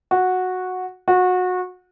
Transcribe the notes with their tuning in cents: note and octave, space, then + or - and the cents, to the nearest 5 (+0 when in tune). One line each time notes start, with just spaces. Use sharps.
F#4 -10
F#4 -25